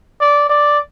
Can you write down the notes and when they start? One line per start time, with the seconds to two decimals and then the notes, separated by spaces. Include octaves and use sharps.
0.21 D5
0.49 D5